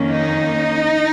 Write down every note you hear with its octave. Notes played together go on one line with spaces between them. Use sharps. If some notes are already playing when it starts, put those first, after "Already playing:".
Already playing: F2 D#3 A#3 C#4
D#4